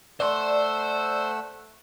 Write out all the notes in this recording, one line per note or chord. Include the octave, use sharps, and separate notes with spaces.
A3 C5 D5 F#5 C6 E6